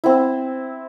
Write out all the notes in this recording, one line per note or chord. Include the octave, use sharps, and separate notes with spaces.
C4 E4